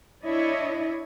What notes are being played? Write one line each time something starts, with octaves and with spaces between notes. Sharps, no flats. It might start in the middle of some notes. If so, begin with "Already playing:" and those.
D4 E4 C#5 D#5